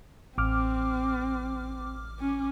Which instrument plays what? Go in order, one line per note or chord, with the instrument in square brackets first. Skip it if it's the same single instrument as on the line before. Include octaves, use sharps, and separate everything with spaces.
[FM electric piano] A1 D6 F6 [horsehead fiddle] C4
[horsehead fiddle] C#4